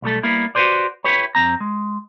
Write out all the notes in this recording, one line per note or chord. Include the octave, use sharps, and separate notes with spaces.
B1 G3 A3 A4
G3 A#3 B3 E4
F#4 G4 A4 B4 C5 D5
E4 G4 B4 C#5
F2 C4 A#5
G#3